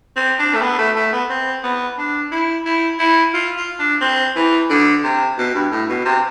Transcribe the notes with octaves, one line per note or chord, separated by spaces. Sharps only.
C4
D4
A3
B3
A3
A3
B3
C4
B3
D4
E4
E4
E4
F4
F4
D4
C4
E3
D3
C3
B2
G2
A2
B2
C3